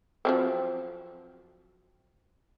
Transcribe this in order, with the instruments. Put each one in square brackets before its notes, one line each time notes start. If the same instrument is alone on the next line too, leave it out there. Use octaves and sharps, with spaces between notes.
[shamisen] F3 F#3 C4